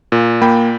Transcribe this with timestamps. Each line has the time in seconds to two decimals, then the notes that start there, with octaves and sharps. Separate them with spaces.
0.12 A#2
0.42 A#3 G5 B5